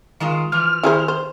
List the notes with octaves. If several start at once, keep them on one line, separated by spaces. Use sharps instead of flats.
D#3 G#3 F4
E3 F3 F6
D#3 E4 G#4 C5
C5